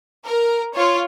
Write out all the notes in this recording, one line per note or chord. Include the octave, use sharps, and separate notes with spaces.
A#4
F4 C#5